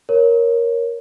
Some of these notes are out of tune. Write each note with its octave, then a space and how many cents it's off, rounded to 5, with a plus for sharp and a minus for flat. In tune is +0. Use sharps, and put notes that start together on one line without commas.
A#4 +10 C#5 +0